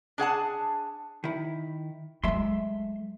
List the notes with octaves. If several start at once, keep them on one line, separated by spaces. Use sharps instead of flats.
D4 G#4 F#5 A5
D#3 E4
F#3 G#3 A3 E5 C6